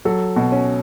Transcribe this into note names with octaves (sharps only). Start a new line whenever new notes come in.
F#3 A4
B2
C#4